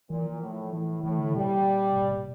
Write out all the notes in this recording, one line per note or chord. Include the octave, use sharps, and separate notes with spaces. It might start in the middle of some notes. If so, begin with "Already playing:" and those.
A#2 E3
F3
A2
A2 E3
A2 E3
D3
A#2 G3
A#2
A#2